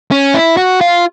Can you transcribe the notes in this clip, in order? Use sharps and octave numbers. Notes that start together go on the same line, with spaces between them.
C#4
E4
F#4
F4